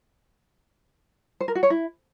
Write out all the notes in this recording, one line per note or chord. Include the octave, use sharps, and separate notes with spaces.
C5
A#4
F#4
C#5
E4